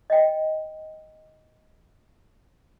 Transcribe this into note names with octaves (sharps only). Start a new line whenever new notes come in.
D#5 G5